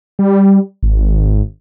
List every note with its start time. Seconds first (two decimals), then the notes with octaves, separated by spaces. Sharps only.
0.19 G3
0.83 G#1